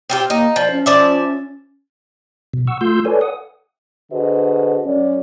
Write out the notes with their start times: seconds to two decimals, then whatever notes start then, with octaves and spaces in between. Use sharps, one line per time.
0.10 C4 F4 G4
0.30 A#3 D#4
0.56 F3 D5
0.71 C#4
0.86 F3 D5 E5
2.54 B2
2.67 F#5 C#6 E6
2.81 A3 F4 C6 E6 G6
3.05 A4 B4 C#5 D5 G#5
3.21 F#5 D#6
4.12 D3 F#4 G#4 B4 C5 D#5
4.85 F#2 C#4 D5